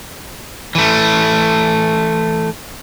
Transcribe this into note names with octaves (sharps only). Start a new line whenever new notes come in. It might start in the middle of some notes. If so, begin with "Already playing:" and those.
E3 A3